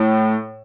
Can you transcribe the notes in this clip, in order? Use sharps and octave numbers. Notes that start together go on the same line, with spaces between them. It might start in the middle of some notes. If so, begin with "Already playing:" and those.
Already playing: A2